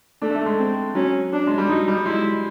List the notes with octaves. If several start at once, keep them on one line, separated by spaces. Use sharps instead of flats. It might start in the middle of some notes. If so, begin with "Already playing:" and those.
A3 D4
A3
G#3
C4
F#3 C#4
D4
G#3
G3
F#3 D#4
G3
G#3 E4